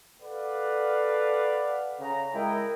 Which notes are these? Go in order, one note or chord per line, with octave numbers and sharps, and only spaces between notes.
A4 B4 D5 F5 F#5
C#3 A#5
G#3 E4 A#4 D#5 G5